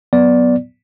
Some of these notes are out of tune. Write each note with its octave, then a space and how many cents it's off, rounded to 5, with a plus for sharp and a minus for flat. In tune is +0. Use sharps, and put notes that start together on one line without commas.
F#3 -10 B3 +0 D5 -5